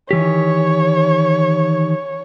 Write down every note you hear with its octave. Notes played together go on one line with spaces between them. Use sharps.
D#3 E3 G4 C#5